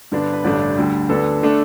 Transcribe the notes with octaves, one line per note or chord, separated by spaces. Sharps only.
G2 D3 B3 D4
B4
A1 G2 D3 A3 D4 D5
D2 D3 G3
D2 D3 B3 D4 A4
D3 A3 D4